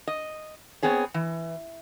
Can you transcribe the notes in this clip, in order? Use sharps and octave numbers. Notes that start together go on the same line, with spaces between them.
D#5
B3 C4 G#4 C#5
E3